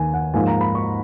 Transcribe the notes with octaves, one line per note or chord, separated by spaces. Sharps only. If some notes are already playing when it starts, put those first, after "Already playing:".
Already playing: D#2 D#3 A#3 G#5
F#5
G#2 F3 A#3 F4 G#5
A#5
B5
C#6